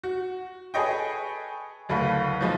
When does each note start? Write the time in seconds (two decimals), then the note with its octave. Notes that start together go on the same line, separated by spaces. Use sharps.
0.04 F#4
0.74 G#4 A4 B4 C#5 D#5 G5
1.89 F#1 D2 A4 B4 F5
2.41 B1 F3 G#3